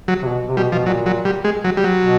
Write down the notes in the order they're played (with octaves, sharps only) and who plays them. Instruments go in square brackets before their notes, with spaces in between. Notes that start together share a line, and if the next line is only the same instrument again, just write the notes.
[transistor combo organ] F#3
[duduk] C3
B2
C3
[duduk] B2 [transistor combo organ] G3
[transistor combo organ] F3
[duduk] B2
[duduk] A#2 [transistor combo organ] F#3
[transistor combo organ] F#3
G3
G#3
F#3
G3
F#3
[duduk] B2